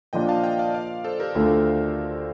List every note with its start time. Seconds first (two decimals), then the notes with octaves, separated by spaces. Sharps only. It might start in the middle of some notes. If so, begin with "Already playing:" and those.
0.13 A#2 F3 A#3 D4 F4 D#5 G5
0.29 F5 A5
0.44 D#5 G5
0.59 D5 F5
0.74 D5 F5
1.04 A4 C5
1.20 G4 A#4
1.35 D2 D3 A3 D4 F4